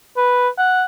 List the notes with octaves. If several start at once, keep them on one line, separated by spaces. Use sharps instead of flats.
B4
F#5